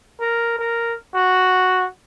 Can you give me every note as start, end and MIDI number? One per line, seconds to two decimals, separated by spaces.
0.20 0.59 70
0.59 0.94 70
1.14 1.85 66